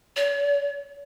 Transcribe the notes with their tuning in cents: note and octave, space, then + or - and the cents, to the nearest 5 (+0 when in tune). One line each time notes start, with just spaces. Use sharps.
C#5 +40